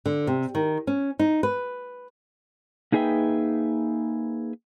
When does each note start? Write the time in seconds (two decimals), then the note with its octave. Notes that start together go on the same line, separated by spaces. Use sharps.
0.06 D3
0.27 C3
0.55 D#3
0.87 C#4
1.19 D#4
1.43 B4
2.92 A#3 D#4 G#4 B4 E5 G5